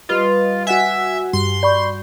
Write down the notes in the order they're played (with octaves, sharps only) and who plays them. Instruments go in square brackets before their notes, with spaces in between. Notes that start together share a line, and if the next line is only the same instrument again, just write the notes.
[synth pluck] G3 B4 D#5 [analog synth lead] F4
[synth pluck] F#4 F#5 G#5 [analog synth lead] E5
[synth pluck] G2 G3 [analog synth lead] C6
[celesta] D5 B5 C#6 [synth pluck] G6